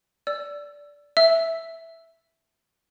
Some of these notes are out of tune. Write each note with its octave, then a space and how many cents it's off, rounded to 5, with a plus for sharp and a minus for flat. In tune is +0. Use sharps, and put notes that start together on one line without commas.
D5 -15 E6 +20
E5 +0 E6 +0